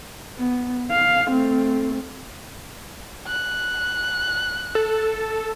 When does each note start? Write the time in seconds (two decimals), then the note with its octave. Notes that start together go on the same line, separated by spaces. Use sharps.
0.38 B3
0.91 F5
1.30 A3 C4
3.27 F#6
4.75 A4